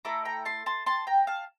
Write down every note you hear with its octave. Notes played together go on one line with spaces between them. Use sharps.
A3 E4 A4 A#5 D6
G5 A#5
A5 C6
A5 C6
A5 C6
G5 A#5
F5 A5